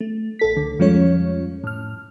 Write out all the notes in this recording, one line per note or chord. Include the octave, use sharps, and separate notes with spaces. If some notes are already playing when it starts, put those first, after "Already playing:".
A3
A1 A4 B6
C#2 D3
F2 F3 G3 G#3 C#4 C#5
A2 F6